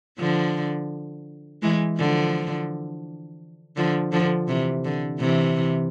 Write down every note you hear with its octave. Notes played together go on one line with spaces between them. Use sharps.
D3 F3
E3 G#3
D3 F3
D3 F3
D3 F3
C3 E3
D3
C3 E3